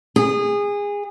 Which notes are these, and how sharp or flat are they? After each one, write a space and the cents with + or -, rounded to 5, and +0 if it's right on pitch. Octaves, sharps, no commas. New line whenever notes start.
G#4 -25